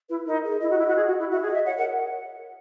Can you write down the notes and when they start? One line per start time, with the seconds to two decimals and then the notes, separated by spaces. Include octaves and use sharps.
0.09 E4 B4
0.26 D#4 A#4
0.44 G#4
0.61 E4 D#5
0.70 F#4
0.79 E4
0.88 F#4
0.97 G#4
1.07 F#4
1.19 E4
1.31 F#4 E5
1.43 G#4
1.48 D#5
1.54 E5
1.66 C#5 F#5
1.77 A#4 F#5